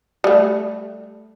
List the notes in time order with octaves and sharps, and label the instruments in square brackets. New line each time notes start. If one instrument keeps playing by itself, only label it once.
[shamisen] G3 A3